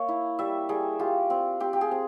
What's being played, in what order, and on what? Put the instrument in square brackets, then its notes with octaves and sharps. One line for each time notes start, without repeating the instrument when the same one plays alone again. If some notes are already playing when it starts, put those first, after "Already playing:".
Already playing: [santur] A#3 C#5 E5
E4
G3 E5
G3 G#4
F4 G4
C4
C4 G4
G4
G#4
C4